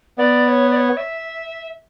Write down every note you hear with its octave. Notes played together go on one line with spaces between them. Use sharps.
B3 D5
D5
C#5
D5
C#5
E5